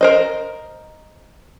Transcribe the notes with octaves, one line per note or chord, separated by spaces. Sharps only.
A#4 C5 D#5